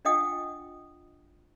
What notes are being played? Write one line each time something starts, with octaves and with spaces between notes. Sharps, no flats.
D4 F4 D#5 F#5 G5 D#6